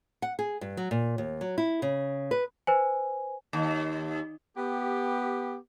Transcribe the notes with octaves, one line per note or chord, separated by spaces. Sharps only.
F#5
G#4
G2
F#3
A#2
D#2
F#3
E4
C#3
B4
B4 C5 G#5
D#2
B3 G4